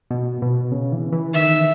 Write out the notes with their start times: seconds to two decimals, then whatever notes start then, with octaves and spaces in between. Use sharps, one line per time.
0.11 B2
0.42 B2
0.72 C#3
0.92 E3
1.12 E3
1.33 D#3 E5